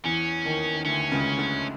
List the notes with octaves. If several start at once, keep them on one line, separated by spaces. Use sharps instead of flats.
E2 E3 C#4
D#2 D#3
D#3
D2 D3 C#4
C#2 C#3
D2 D3